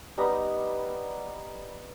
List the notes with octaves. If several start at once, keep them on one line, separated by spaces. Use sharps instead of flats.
G3 B3 D#4 A#5